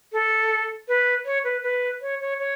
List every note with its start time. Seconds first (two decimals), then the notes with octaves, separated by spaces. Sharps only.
0.13 A4
0.88 B4
1.26 C#5
1.44 B4
1.63 B4
2.02 C#5
2.21 C#5
2.39 C#5